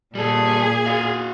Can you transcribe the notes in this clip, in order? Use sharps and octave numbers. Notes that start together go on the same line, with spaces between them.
A#2 G3 G#4 A4
F#4 F5